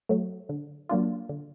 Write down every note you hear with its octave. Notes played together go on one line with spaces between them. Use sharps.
F#3 A3
D3
F#3 A#3 D4 F4
D3